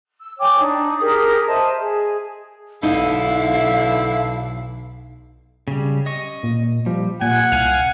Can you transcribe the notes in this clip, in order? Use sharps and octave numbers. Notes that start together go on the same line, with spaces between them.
E6
C#5 G5 G#5 D6
D4 D#4
G4 G#4 A#4 D#6
C5 D#5 E5 A5
G#4
B1 D3 D#4 E4 E5 F5
C#3 G3
D#5 C#6
A#2
F3 G3
A#2 F#5 G#5
C2 F5 G#5